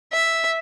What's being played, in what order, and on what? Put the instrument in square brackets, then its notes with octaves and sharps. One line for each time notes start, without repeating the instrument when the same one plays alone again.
[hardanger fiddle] E5